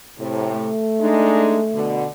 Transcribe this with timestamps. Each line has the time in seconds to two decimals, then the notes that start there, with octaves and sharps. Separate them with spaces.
0.18 A2 C3
0.52 A3
0.99 G#3 D4 D#4
1.72 B2 D3